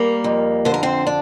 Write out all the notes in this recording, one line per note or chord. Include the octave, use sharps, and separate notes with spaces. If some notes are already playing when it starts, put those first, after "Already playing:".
Already playing: G3 A#3 A#4
F2
D3 C5
A#4
C4 C5
D4